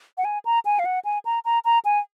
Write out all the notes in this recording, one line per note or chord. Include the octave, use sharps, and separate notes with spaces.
F#5
G#5
A#5
G#5
F5
F#5
G#5
A#5
A#5
A#5
G#5